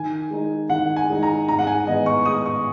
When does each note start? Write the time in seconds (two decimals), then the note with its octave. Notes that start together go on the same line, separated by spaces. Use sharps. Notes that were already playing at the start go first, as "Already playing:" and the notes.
Already playing: D#3 G#5
0.31 G#3 D#4
0.70 D#3 F#5
0.96 G#5
1.10 G#3 D#4
1.23 A#5
1.48 G#2 A#5
1.59 F#5
1.67 G#5
1.87 D#3 G#3 B3 D#5
2.06 C#6
2.25 G#2 D#6
2.46 C#6